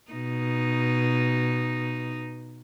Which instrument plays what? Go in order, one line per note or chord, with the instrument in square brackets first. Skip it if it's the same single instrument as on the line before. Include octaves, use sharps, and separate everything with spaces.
[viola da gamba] B2 D#4